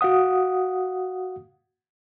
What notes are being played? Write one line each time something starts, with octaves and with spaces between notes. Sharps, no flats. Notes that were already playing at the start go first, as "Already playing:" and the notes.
F#4 F5 F#5 D#6